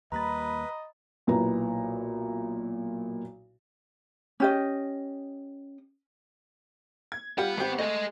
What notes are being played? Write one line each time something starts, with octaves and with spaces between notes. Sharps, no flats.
D#2 G3 A#3 B4 D#5 A#5 B5 A6
B1 A#2 E4 B4 A#5
C#4 G4 D#5
G#6
G3 B3 F4 G4 F#5
G#1 C4 G4
A3 G#4 D#5